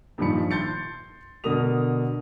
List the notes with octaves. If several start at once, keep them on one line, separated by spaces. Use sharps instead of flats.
G2 A#2 D#3 F3 B5 C#7
C6 G6 A6 C#7
B2 D3 A#4 D#6 F7